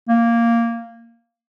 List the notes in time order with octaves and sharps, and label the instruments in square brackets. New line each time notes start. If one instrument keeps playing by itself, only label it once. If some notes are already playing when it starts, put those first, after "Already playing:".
[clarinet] A#3